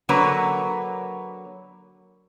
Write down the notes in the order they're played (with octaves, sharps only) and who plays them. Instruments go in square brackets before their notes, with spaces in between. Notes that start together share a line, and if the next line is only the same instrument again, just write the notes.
[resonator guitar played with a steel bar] D3 F#3 A#3 B4 C#5